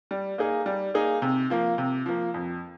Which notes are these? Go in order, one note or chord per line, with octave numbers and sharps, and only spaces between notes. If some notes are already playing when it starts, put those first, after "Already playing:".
G3
A#3 D#4 G#4
G3
A#3 D#4 G#4
C3
F3 A#3
C3
F3 A#3
F2